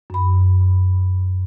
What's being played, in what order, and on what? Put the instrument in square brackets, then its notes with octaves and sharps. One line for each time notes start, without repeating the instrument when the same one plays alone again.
[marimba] F#2 B5